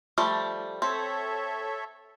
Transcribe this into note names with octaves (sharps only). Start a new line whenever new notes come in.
F3 G3 A3
C4 A4 C#5 E5